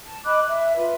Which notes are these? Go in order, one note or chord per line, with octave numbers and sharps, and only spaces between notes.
A5
D#5 B5 D6 F#6
E5
F4 B4